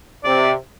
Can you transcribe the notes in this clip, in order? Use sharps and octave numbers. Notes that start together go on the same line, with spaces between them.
C3 D5